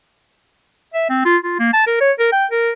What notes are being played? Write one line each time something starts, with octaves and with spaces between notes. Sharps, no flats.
E5
C4
F4
F4
A#3
A5
A#4
C#5
A#4
G5
A#4